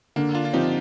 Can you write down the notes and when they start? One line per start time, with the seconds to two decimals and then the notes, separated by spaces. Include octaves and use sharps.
0.16 D3 A#3 D4
0.35 D4 F4
0.45 F4
0.53 F3 C4 D#4 G4